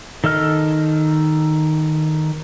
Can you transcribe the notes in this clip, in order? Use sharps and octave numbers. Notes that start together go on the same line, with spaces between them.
D#3 A4 D#5 F6